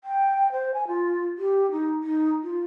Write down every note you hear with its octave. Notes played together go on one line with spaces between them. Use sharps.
G5
C5
G#5
F4
G4
D#4
D#4
F4